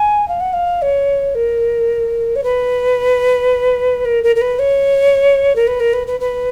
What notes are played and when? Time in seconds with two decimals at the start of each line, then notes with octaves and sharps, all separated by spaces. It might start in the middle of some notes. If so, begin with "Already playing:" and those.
Already playing: G#5
0.28 F5
0.40 F#5
0.53 F5
0.82 C#5
1.35 A#4
2.35 C#5
2.43 B4
4.05 A#4
4.23 A#4
4.36 A#4
4.41 B4
4.59 C#5
5.56 A#4
5.67 B4
5.80 A#4
5.93 B4
6.07 B4
6.20 B4